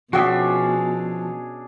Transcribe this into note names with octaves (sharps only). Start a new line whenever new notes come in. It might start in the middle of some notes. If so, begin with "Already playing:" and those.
B2 F3 C#4 D4 F#4 G#4 E5 G5